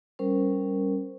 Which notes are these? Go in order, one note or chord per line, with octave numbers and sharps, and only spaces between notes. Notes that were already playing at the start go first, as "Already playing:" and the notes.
G3 C#4 A#4 C5